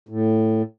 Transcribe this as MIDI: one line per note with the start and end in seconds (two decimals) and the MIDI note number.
0.09 0.62 45